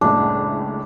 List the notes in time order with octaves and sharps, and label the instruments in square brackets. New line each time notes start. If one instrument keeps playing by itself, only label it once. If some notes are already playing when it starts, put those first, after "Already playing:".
[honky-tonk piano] F#1 C#2 A2 [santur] D4